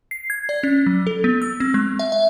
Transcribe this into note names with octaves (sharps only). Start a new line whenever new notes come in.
C7
G#6
D5
C#4
F#3
A4
B3
E6
C4
G#3
E5
E5